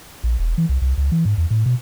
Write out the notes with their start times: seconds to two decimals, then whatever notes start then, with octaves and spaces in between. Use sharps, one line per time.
0.24 A#1
0.39 E1
0.58 E3
0.69 C2
0.82 C2
0.98 C#2
1.12 E3
1.25 G#2
1.38 E2
1.51 A2
1.66 B2